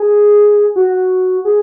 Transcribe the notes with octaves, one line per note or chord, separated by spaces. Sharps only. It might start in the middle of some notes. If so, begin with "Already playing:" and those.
Already playing: G#4
F#4
G#4